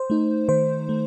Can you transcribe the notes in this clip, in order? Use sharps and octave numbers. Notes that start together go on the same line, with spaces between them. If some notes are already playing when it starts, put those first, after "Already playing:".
Already playing: C5
A3 D#4
D#3 C5
A3